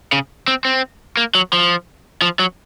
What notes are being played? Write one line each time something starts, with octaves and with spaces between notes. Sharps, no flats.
C#3
C4
C4
A#3
F#3
F3
F3
F#3